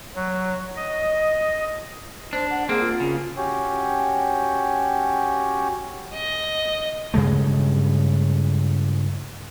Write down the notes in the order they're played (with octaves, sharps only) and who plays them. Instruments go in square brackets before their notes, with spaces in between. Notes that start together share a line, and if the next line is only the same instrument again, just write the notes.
[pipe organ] F#3
D#5
[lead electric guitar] D4 [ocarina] C5
[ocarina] F#5
[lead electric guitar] A#3 C4 [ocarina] G#4
[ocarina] F4
[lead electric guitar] C#3
[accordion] C#4 F#4 G4 C#5 G5
[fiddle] D#5
[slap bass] G2 C#3 G#3 A3